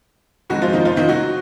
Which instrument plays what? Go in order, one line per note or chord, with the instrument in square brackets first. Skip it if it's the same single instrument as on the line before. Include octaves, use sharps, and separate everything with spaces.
[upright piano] F2 D#3 F#3 G#3 F#4
F3 F4
D#3 D#4
F3 F4
D#3 D#4
F#3 F#4